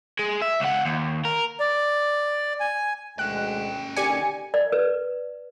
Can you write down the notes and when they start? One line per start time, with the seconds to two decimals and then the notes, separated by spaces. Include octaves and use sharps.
0.19 G#3
0.42 E5
0.60 C#2 F#5
0.85 D#2
1.25 A#4
1.60 D5
2.60 G#5
3.19 D2 G#3 C#4 G5 F#6
3.97 A#2 D3 D#3 G4 D5 G#5 C#7
4.54 D5
4.72 B4